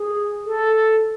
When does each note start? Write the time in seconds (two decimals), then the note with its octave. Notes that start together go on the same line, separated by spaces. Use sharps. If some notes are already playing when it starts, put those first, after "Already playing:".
Already playing: G#4
0.46 A4